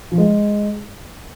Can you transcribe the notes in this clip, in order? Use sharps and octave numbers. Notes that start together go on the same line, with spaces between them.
F3
G#3